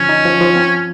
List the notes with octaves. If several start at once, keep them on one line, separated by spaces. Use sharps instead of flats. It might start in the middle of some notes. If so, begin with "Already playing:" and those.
Already playing: D3 F3 C#4
D#4
F3
F3
C4